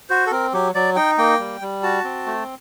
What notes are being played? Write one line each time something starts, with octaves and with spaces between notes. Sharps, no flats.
F#4 C5
A4
C4 A#4
F#3 G4
F#3 D5
D#4 G5
A#3 G5
G3
G3
F#4 A5
C4
A3